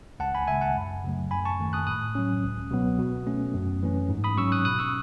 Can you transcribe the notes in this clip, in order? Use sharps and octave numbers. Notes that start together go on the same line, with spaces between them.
C#2 F#5 A5
G#5 B5
C#3 G#3 E5 G#5
F#5 A5
F#2
C#3 F#3 A3
F#2 G#5 B5
A5 C#6
D#3 A3
D#6 F#6
A2 D#6 F#6
F#3 C#4
C#2
B2 F#3 B3
B2
A3 C#4
F#2
E3 A3 C#4
G#2
B5 D#6
F#3 C#4 C#6 E6
D#6 F#6
B2 D#6 F#6
C#6 E6